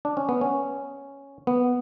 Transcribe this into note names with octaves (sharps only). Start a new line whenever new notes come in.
D4
C#4
B3
C#4
B3